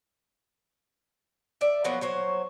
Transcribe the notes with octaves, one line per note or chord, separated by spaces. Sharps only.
D5 E5
F3 F#3 A#3 B3
F#3 C5 C#5